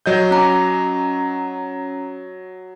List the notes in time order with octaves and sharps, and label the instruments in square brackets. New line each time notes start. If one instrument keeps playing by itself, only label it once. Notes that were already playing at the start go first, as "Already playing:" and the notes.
[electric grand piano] F#3 D#5 G6
[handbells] C#4 A#5